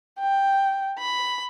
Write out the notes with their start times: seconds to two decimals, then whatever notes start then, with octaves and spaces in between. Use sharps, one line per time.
0.20 G5
0.99 B5